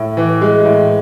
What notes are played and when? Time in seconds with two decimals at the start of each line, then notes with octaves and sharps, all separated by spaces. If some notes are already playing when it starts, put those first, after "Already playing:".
Already playing: A2
0.17 E3
0.42 G#3
0.65 A2